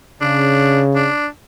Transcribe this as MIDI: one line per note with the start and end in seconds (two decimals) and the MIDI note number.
0.21 1.08 49
0.21 0.82 62
0.95 1.26 62